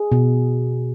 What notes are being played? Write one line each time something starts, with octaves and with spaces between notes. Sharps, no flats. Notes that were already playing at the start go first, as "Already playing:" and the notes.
Already playing: G#4
B2